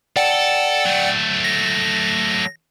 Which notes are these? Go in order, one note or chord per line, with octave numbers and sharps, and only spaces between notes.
A4 D5 F#5 G5
F#3 A3
A#6